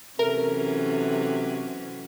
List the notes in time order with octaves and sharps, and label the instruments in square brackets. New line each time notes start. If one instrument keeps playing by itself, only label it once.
[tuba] C3 [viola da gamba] E3 F#3 C#4 [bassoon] A3 [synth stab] A#4